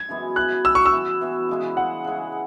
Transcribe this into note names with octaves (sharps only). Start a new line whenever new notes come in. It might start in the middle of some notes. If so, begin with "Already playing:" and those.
Already playing: G#6
F#2 E3 G#3 B3
E3 B3 F#4 F#6
E3 B3 F#4 E6
C#6
E6
E3 B3 F#4
E3 B3 F#4
C#3 G#3 E4
C#3 G#3 E4 F#5
C#3 G#3 E4